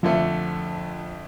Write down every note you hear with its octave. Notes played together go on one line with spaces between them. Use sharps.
F2 D3 F3 A3 F4